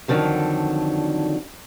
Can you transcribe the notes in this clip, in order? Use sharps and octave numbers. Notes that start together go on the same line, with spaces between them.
F2 B2 D3 D#3 F#3